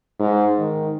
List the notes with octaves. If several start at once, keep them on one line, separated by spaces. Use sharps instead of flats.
G#2
D#3